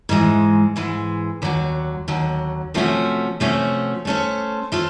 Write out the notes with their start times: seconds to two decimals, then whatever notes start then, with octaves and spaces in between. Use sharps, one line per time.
0.09 G#2 E3 G#3
0.76 G#2 E3 G#3
1.42 D#2 D3 F#3
2.08 D#2 D3 F#3
2.74 C3 F3 A3 C#4 F#4
3.40 C3 F3 A3 C#4 F#4
4.05 A3 C#4 F4 A4 C5
4.72 A3 C#4 F4 A4 C5